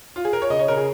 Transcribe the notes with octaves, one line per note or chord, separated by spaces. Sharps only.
F4
G#4
A#4
C#5
C#3 D#5
C#5
C#3 A#4
G#4